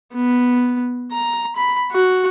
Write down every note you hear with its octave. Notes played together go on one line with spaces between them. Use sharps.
B3
A#5
B5
F#4